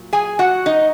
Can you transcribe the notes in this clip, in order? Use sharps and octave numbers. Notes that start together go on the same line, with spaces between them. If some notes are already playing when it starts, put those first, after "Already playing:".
Already playing: A#2 F#3
G#4 G#5
F#4 F#5
D#4 D#5